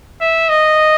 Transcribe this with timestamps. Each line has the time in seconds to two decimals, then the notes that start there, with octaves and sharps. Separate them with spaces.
0.21 E5
0.49 D#5